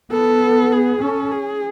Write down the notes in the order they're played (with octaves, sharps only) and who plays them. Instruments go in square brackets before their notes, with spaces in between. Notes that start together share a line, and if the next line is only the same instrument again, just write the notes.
[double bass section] B3 [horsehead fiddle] A4
[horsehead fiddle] G#4
[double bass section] C#4 [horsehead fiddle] A4
[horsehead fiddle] G#4